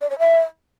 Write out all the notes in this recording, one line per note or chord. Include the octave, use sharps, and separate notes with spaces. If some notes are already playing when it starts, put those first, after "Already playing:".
D5
C#5
E5